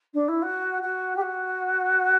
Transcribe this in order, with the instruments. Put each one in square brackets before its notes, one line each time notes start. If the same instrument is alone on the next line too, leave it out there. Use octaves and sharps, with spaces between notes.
[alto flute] D4
E4
F#4
F#4
G4
F#4